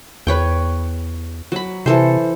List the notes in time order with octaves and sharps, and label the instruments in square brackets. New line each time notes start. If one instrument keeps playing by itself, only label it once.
[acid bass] E2 [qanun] B4 C#5 G5
[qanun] F#3 B5
[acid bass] C3 [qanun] E3 A4 C5